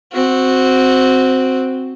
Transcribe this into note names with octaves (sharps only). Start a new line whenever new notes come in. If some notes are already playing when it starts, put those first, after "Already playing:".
C4 F#4